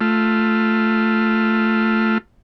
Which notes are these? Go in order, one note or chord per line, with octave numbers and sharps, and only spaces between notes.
A3 F4